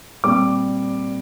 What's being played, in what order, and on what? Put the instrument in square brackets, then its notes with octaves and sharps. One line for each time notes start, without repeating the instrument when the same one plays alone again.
[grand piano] A#2 G3 C4 D6